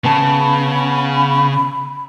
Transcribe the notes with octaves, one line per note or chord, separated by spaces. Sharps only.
C#3 B3 A5 B5